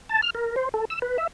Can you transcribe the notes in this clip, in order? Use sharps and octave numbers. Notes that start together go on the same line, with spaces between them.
A5
F6
A#4
C5
A4
E6
B4
E5